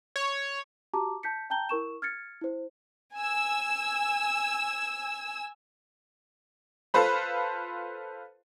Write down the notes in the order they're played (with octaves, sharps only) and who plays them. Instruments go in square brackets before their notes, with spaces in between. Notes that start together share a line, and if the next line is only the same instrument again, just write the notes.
[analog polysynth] C#5
[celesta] F#4 G4 A5 A#5 D6
A5 G6 B6 C#7
G5 A5 A#5 G6 G7
E4 A#4 C#6 E7
F6 G#6 A6 C#7
E4 C5
[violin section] G#5 E6
[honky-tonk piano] F4 A4 B4 C5 B5